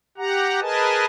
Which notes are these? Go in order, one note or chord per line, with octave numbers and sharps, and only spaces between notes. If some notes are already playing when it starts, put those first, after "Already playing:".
G4 F#5 A#5
G#4 A#4 B4 D#5 G#5 A5